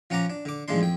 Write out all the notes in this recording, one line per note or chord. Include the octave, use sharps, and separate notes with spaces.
F3 C#4 F#5 A#5 D6
D4
D3 D6
A1 F3 G#3 D4 C6
F2 G5